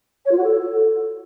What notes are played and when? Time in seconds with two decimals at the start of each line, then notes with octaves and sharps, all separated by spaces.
0.25 C#5
0.31 F4
0.37 F#4
0.43 A4